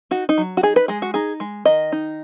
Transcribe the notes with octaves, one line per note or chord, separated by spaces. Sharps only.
D#4 F#4
D#4
F#3
F#4
D#4 G#4
B4
G#3 G#4
F#4
D#4 G#4
G#3
D#3 D#5
D#4